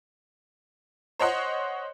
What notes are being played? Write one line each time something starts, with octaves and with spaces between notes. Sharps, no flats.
C5 C#5 D#5 F#5 C6